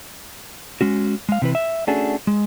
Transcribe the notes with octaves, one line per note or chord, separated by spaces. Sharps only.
G#3 C#4 F#4
G#3 F5
C3 E3 B4
E5
A3 C#4 D4 F#4 G#4 A4
G#3